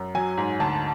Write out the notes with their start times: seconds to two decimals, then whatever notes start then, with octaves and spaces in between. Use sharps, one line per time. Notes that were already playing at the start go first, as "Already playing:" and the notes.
Already playing: F#2
0.15 F#3 G#5
0.38 G#2
0.60 D2 A5